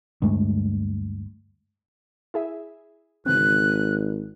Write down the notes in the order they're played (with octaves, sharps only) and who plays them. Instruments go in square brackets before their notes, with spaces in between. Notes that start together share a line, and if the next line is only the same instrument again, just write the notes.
[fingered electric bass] D2 G2 G#3 A3
[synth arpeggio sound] E4 G#4 E5
[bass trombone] G#1 [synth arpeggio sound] C#3 E3 C4 [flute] F#6